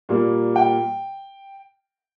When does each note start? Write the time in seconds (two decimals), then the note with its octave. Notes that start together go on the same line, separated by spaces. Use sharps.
0.09 A#2 G3 A#3
0.56 G5